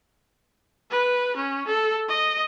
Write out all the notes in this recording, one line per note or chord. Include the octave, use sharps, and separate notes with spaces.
B4
C#4
A4
D#5